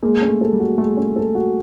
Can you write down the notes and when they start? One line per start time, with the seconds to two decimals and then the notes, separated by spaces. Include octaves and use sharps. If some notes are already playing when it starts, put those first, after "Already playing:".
0.03 G#3 A#3
0.21 C#4
0.28 A3
0.41 A4
0.53 G3
0.60 F#4
0.78 G#3 A3
0.97 C#4
1.16 A4
1.35 F#4